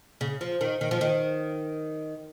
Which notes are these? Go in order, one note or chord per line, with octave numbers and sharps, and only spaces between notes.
C#3
F3
D#3
D#3
F3
D#3